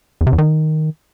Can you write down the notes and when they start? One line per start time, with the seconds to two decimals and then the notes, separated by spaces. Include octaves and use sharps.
0.21 E2
0.27 C3
0.33 E2
0.38 D#3